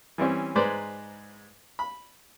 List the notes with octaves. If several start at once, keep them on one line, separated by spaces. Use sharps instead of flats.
E3 G3 C4 C#4
G#2 G#3 B4 C5 D5 A#5
B5